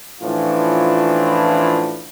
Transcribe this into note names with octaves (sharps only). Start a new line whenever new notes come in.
A2 E3 F3 C#4 D4 F4